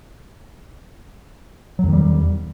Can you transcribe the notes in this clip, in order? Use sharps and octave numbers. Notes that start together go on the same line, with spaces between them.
E2 D#3 F#3 G3